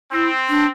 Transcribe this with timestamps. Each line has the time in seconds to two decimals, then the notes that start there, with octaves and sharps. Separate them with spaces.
0.12 C4 E4
0.49 D4